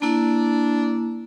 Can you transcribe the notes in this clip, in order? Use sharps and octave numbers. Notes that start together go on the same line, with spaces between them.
A#3 D4 E4